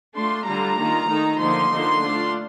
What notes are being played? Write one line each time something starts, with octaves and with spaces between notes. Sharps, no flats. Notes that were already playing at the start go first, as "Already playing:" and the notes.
A3 D4 F4 C6
D3 G3 D4 F4 A#5
D#3 A#3 F4
D#3 A3 D#4
D3 F3 A#3 D#4 C6
D3 F3 A#3 D#4
A3 D4 F4